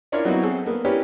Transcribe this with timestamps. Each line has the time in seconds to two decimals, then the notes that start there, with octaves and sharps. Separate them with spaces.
0.12 C#4 D4 E4 F4 A#4 C#5
0.25 F#3 B3 C4 D#4 E4 F#4
0.43 C4 G#4 A4
0.66 A#3 B3
0.85 C#4 D4 E4 G4 A#4 B4